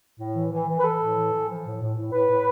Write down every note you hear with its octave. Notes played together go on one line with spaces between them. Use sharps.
A2
E3
E3
E3
B4
E3 A4
A2
E3
E3
F3
A2
A2
A2
A2 B4
A2